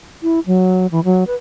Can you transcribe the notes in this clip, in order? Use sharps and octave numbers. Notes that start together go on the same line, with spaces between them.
E4
F#3
E3
F#3
B4